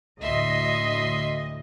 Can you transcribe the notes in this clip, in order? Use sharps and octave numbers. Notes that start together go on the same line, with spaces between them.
D2 A2 D#5 E5 C6